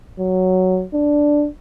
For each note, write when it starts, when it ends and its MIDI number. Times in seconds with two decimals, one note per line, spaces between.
0.19 0.84 54
0.94 1.47 62